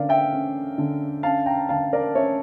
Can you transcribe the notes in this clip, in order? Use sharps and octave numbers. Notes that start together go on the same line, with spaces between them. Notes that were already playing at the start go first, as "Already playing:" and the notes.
Already playing: D3 C#4 A#4 D5 F5
E5 G5
C#4
D3
C#4 F5 A5
G5 A#5
D3 F5 A5
A#4 D5
C#4 C#5 E5